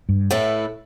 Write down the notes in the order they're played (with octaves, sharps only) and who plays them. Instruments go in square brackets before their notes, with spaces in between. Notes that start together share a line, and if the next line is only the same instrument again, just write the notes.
[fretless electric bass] G2
[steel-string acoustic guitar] A2 A3 E4 B4